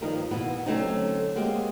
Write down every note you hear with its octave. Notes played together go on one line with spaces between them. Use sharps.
G2 D#3 F3 A#4 D#5
B2 E3 A#3 B3
D3 F#3 A3 C4 C#4 D#4
G#3 A#3 C4 F#4 G4 D#5